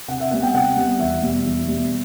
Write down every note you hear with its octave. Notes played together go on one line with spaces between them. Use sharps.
C3 F#5
E5
G3 B3 F#5
G5
C3 F#5
G3 B3
E2 E5
B2 G3
E2
B2 G3